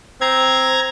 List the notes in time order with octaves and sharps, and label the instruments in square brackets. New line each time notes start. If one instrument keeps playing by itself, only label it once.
[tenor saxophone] C4 [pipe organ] A#5 G#6